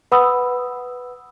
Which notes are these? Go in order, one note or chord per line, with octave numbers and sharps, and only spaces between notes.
B4 F#5 B5 D#6 E6